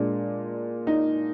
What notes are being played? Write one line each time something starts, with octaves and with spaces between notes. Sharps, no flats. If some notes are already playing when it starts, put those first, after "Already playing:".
Already playing: A#2 G#3 D4
D#4